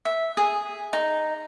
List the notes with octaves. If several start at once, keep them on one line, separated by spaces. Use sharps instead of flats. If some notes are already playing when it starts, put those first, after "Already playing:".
E5
G#4
D#4